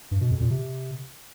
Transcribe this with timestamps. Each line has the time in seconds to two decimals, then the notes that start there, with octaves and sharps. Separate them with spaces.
0.11 G2
0.21 B2
0.31 F2
0.41 A#2
0.50 C3